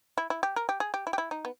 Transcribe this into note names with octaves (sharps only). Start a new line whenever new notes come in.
E4
E4
G4
A#4
G4
G#4
G4
E4
G4
E4
D#4
B3